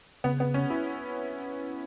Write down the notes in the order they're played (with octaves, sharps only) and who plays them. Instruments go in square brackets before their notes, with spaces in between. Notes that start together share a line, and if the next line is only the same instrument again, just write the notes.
[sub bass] C#3 [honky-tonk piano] B3
[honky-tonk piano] B3
C#4
E4